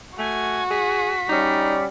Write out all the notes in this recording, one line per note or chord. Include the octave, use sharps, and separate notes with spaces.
A3 F#4 G#5
G#4 B6
G3 C#4 D#4 D5